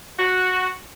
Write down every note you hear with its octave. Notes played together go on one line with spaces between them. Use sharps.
F#4